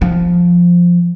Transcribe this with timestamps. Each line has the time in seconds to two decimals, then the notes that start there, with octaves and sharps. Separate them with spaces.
0.02 F3